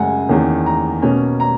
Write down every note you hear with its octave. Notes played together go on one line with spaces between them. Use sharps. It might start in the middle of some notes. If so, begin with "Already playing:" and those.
Already playing: F#2 C#3 G#3 F#5 G#5
E2 D#3 A#3 C#4
A#5
B2 A#3 C#4
A#5